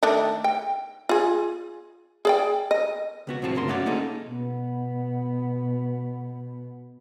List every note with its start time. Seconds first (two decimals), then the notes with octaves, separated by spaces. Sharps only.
0.03 D#3 A3 D4
0.44 G5
1.09 F4 G#4
2.25 G#4 D5 G5
2.71 D#5
3.27 C#2 B3 F#4
3.42 C2 A2 F3 C4 F#4 A5
3.55 D2 G2 C#3 A#4 C6
3.68 A3 C#4 F#4 C#5 D5
3.86 A#3 C#4 D#4 G#4 A4
4.28 B2 B3